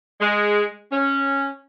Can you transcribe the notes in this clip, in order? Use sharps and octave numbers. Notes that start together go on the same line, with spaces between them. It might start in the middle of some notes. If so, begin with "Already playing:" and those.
G#3
C#4